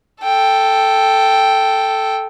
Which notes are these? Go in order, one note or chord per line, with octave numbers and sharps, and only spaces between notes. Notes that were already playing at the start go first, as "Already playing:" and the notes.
A4 G5